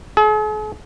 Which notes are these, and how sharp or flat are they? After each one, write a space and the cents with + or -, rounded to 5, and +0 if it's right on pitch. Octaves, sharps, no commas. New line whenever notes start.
G#4 +45